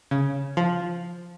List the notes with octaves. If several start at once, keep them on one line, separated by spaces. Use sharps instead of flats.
C#3
F3